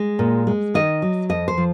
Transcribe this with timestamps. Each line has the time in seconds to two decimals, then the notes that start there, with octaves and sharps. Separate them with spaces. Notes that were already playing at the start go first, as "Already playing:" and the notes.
Already playing: G#3
0.19 A#2
0.47 G#3
0.74 D#3 D#5
1.02 F#3
1.29 F2 D#5
1.48 C5
1.58 F3